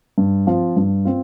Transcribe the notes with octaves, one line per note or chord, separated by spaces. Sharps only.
G2
F3 C4 F4
G2
C4 F4